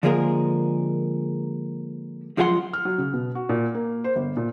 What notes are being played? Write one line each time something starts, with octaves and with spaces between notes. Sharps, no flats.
D3 F3 G#3 A#3 G#4 A#4
F#2 F3 G#3 G#4 F#5 C6
F6
F#3
C#3
B2
F#4
A#2
A#3
C5
G1
A#2